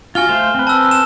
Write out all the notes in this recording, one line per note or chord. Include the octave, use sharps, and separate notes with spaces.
F4 F#4 G#5 F6 G7
A3 C5 F5
C4 B4
A5 E6
E7